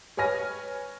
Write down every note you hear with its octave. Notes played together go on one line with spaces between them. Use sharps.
B4 C#5 G#5 F6 A#6